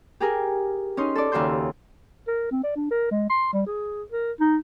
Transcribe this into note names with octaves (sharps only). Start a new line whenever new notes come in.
G4 G#4 A#4
C#4 D#4 C6
A4 D5
D#2 C#3 F#4 E5 C6 G6
A#4
C4
D5
D4
A#4
G#3
C6
G3
G#4
A#4
D#4